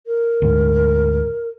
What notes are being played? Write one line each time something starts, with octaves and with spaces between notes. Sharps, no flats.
A#4
D2 G#2